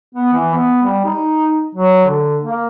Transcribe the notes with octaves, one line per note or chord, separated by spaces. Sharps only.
B3
E3
B3
G3
D#4
F#3
D3
A#3